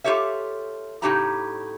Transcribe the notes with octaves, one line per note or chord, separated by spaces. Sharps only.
F4 G4 A4 C#5 E5
A2 C#3 D#4 G4 A5 A#5